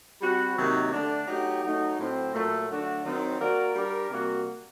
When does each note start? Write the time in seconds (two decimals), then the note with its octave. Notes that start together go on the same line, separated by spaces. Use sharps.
0.21 G3 C4 F#4
0.57 C3 D#3 F#3 A#3 D#4
0.92 D3 A3 D4
1.27 F#3 A3 D#4 G4
1.63 F#3 A3 D#4
1.98 A2 F#3 C4
2.34 A#2 F#3 A3
2.69 D3 F#3 A3 D4 F#4
3.05 D#3 F#3 C4
3.40 A#3 F#4 A#4 D5
3.76 G3 D4 G4 A#4
4.10 C3 G3 A#3 F#4